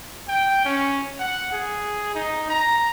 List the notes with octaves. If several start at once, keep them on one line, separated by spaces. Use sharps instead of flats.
G5
C#4
F#5
G#4
D#4
A#5